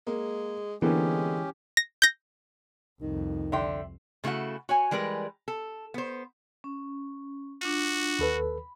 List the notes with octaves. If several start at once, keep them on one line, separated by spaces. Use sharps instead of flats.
G#3 A#3
D3 E3 G#3 A#3 B3 C#4 G4
A#6
G6 A#6
C2 F2 D#3
D3 E5 G5 C6
C#3 A3 E4 F#4 F#5
F#4 C#5 G#5
E3 G3 G#3 A#4 B4
A4
B3 C5
C#4
D4 F4 F#4
D#2 A4 B4 B5